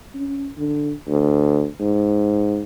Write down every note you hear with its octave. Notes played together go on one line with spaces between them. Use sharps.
C#4
D3
D2
G#2